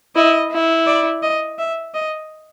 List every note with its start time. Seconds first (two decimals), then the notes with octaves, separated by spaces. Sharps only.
0.16 E4 D#5
0.52 E4
0.87 D5
1.23 D#5
1.59 E5
1.94 D#5